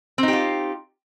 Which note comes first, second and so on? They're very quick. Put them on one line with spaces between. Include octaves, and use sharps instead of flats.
C4 D#4 G4 F4